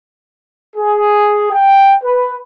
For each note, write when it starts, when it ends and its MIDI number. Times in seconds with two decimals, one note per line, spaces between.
0.76 1.50 68
1.52 1.94 79
2.04 2.34 71